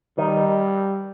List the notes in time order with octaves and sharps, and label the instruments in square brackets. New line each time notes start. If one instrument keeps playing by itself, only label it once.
[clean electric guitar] D#3 D#4 [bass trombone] G3